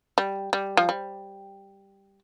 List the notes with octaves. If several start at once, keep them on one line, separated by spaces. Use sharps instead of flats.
G3
G3
F3
G3